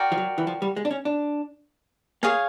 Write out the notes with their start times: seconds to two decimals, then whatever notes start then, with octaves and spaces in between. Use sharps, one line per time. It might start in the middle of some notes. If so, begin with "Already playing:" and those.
Already playing: F#4 A#4 D5 G5
0.12 F3
0.18 F#3
0.38 E3
0.47 F3
0.62 G3
0.76 G#3
0.85 D4
0.91 C#4
1.05 D4
2.23 A#3 G#4 C#5 F5 G#5